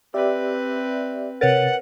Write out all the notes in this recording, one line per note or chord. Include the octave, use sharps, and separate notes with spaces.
C4 G4 B4 D5 E5
C3 A#4 B4 C#5 F#5 A6